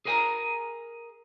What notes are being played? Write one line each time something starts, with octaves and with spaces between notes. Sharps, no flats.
G#4 A#4 B4 G5 G#5 A#5